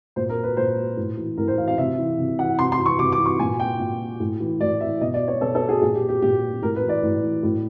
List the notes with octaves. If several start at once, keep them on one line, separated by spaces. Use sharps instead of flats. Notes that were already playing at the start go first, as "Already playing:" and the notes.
A#2 C5
A#4
B4
A#2 C5
A2
E3
A2 A#4
C5
E3 F5
F5
C3 E5
E3
C3
E3 F#5
C3 C6
C6
E3
C#6
C3 D6
D6
E3
C#6
A#2 G#5
G5
A#2
A2
E3
A2 D5
E3 E5
B2 D#5
D5
C#5
B2 A4
A4
G#4
A#2 G#4
G4
G4
A#2 G4
A2 A#4
B4
E3
D5
A2
E3
A2